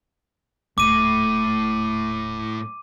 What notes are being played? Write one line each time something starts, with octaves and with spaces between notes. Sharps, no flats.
D#1 A2 D6 D#7